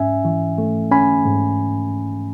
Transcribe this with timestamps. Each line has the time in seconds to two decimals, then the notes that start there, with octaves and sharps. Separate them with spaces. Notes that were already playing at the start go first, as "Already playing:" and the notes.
Already playing: G#2 C#4 E5 G#5
0.25 E3
0.58 A3
0.91 C#4 G#5 B5
1.26 G#2